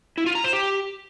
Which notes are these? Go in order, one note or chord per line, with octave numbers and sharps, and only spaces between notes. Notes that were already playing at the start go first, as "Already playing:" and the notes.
E4
F4
A#5
C5
G4